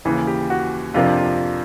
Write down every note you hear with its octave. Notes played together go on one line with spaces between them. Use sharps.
D#2 C#3 E3
G4
F#4
F2 C3 F3 A#3 D4 F4
F4